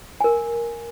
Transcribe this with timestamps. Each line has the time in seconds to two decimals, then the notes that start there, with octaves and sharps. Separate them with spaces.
0.20 A#4 G#5